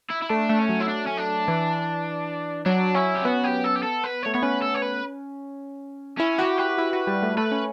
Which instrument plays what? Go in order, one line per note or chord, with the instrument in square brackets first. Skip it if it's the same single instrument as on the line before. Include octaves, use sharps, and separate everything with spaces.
[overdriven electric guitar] E4
E4
[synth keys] A3 [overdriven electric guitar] D4
[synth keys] A3
[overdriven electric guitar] C#4
[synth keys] F#3
[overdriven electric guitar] E4
D4
C#4
D4
[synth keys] E3
[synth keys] F#3 [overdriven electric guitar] D4
[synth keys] C#4 [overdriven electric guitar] E4
[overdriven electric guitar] G4
[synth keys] B3 [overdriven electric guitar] F#4
[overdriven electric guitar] G4
A4
G4
A4
B4
C#5
[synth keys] A3
[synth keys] B3 [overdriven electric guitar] C#5
[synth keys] C#4 [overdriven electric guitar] B4
[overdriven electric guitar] A4
C#5
B4
[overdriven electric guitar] C#4 [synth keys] E4
[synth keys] F#4 [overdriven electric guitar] G4
[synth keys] G4 [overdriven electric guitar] B4
[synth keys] E4
F#4
G3
A3
[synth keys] A3 [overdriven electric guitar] B4
[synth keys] C#4